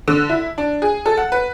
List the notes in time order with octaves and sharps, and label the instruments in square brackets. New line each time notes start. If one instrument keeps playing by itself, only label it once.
[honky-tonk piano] D3
E4
D4
G#4
A4
F#5
B4